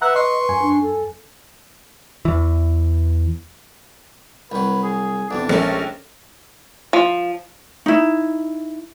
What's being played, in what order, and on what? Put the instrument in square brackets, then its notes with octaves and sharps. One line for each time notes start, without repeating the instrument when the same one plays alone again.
[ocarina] B4 [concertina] E5 F#5 [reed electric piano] A#5 F#6
[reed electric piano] D#5 [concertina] C6 C#6
[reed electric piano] F#2 G#5
[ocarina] D4
A4
[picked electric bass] E2 E3
[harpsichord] C2 F#3 [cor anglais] B4
[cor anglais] G#4
[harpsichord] B1 E2 C3 [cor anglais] D4
[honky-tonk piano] A#1 C#4 [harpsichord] G#3 A4 A#4 [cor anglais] A3
[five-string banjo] F3
[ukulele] D#4 E4